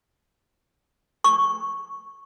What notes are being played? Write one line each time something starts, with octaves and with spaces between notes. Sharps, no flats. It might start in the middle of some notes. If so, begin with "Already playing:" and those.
C#6